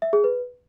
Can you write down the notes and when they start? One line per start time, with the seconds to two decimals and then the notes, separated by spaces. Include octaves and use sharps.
0.02 E5
0.13 G#4
0.24 B4